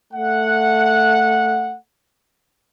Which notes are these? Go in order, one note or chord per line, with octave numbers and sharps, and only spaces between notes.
A3 F#5